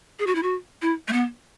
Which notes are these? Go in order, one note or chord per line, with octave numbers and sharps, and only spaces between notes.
G#4
F#4
E4
F#4
E4
A3
B3